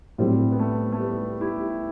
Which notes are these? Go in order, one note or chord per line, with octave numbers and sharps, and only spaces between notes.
A2 F#3 G3 C4
B3
A3
A3
G3 B3
E4 G4